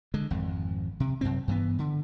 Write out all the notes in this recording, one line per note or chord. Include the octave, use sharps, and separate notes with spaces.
D3 G#3
G#1 F2
C3
F#2 C3 C4
G2 E3 B3
D3